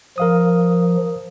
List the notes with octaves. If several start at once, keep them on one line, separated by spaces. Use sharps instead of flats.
F3 A#4 F5 D#6